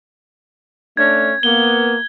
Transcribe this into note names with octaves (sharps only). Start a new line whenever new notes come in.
A3 C#4 D4 G#6
A#3 B3 G7